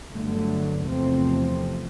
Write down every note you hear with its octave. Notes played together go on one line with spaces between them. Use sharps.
G1 G2 D3 F#3 A3
E2 C3 F3 A3 C4